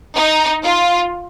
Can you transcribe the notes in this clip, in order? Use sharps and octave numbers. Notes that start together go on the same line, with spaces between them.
D#4
F4